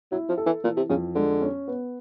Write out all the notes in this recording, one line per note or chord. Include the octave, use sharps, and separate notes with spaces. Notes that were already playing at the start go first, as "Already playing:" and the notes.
F#3 E4
F3
A4
E3
A#2 E3
C3
F2 C#3
D3 G#3
C#4
B3